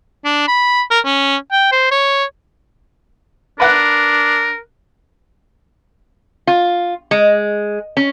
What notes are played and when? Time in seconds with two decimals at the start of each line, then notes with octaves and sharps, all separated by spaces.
0.25 D4
0.48 B5
0.91 A#4
1.05 C#4
1.52 G5
1.72 C5
1.91 C#5
3.60 D4 A#4 B4 F#5 F#6
6.47 F4
7.11 G#3
7.97 C#4